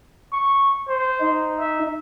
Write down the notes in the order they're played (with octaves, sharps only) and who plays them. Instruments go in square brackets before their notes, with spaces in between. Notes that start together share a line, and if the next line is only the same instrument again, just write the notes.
[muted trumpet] C#6
C5
[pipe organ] D#4
[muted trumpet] E5